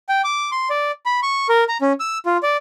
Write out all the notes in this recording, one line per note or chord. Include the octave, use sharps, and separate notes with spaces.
G5
D6
C6
D5
B5
C#6
A#4
A#5
C#4
E6
F4
D5